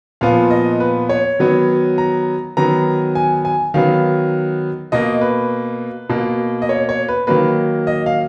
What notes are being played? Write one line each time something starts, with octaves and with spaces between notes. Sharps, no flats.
A#2 F3 B3 F5
D#5
B4
C#5
D#3 F#3 B3
A#5
D#3 F#3 B3 A#5
G#5
G#5
D#3 F#3 B3 F5
B2 A#3 D#5
B4
B2 A#3
D#5
C#5
C#5
B4
D#3 F#3 A#3 B4
D#5
F5